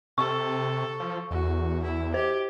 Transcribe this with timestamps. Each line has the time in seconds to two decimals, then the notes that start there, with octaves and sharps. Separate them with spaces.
0.18 C3 A4 C#6
1.00 F3
1.31 E2 F#4
1.83 E4
2.14 G4 C5